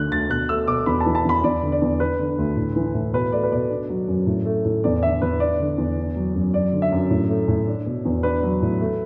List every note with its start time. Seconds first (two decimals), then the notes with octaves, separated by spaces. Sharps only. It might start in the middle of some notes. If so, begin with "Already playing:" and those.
Already playing: D2 D3 F#6
0.11 D2 A6
0.30 B2 F#6
0.49 A3 E6
0.68 B2 D6
0.86 E2 B5
1.00 A5
1.06 E3
1.15 A5
1.25 E2 B5
1.44 E2 D5
1.62 D3
1.72 D5
1.81 E2
2.00 D4 B4
2.19 D3
2.38 D2
2.57 A2
2.76 E3
2.94 A2
3.13 B2 B4
3.32 A3 D5
3.43 B4
3.52 B2 D5
3.70 D4
3.89 F#3
4.08 F#2
4.27 A2
4.45 A3
4.65 A2
4.84 E2 D5
5.02 D3 E5
5.22 E2 B4
5.40 D4 D5
5.59 D3
5.78 E2
5.98 D4
6.16 F#3
6.35 F#2
6.53 F#2 D5
6.72 D3
6.82 E5
6.92 F#2
7.10 A2
7.29 A3
7.48 A2
7.68 D4
7.86 B2
8.05 E2
8.23 D4 B4
8.43 F#3
8.62 A2
8.81 A3